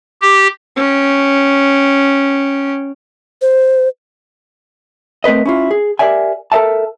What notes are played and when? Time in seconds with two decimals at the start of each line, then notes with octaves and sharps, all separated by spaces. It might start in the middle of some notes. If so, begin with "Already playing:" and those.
0.22 G4
0.77 C#4 G5
3.42 C5
5.24 A3 C4 A#4 B4 D#5
5.45 C#4 E4 F4
5.71 G#4
5.99 G4 A#4 D5 E5 G#5
6.52 A4 A#4 D#5 E5 A5